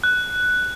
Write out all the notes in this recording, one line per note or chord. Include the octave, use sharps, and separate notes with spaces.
F#6